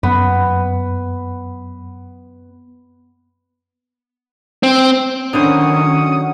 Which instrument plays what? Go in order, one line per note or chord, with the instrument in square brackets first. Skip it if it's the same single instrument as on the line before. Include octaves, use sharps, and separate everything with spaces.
[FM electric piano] F#2 [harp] B3
[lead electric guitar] C4
[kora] D3 E4 C5 [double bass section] D#3 C#4 [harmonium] F#3 F#5 [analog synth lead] D#6